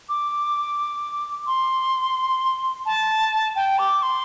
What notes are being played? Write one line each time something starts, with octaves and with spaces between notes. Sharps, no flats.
D6
C6
A5
G5
D6
C6